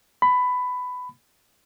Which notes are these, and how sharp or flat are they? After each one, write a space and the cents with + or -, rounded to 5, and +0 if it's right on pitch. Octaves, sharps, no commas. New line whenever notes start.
B5 +15